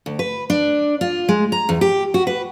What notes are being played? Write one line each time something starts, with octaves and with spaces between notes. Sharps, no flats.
D2
B4
D4
F4
G#3
A#5
E2
G4
F#4
B4